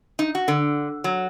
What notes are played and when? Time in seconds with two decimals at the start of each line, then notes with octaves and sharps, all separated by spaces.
0.19 D#4
0.35 F#4
0.48 D3
1.04 F#3